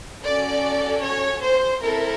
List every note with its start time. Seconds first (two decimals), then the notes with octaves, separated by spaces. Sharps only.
0.25 C#4 F#4 A4 D5
1.04 C#5
1.42 C5
1.82 C4 E4 A4 A#4